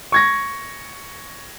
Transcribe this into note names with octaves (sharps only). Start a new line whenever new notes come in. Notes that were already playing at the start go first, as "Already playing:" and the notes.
C#6 G#6 A#6